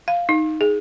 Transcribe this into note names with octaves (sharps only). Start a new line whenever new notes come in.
F5
D#4
G#4